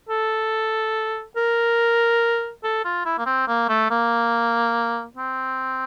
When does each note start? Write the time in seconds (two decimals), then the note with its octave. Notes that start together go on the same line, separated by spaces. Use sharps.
0.09 A4
1.37 A#4
2.64 A4
2.85 F4
3.05 E4
3.18 A#3
3.26 C4
3.48 A#3
3.69 A3
3.91 A#3
5.17 C4